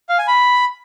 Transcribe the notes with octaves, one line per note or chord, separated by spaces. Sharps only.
F5
G#5
B5